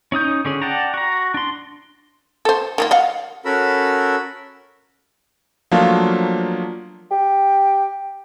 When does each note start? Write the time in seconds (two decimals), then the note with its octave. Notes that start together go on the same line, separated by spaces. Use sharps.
0.12 C#4 D#4 D#6 G6
0.45 D3 C#4 G#4
0.62 D5 F#5 G5 A5 A#5
0.94 F#4 A#5
1.34 D4 C6
2.45 A4 C5
2.78 D#3 A#3 F4
2.91 D#5 F5 F#5
3.45 C#4 F#4 A4 A#4 B5 E6
5.71 F3 F#3 A3 A#3 D4 F4
7.11 G4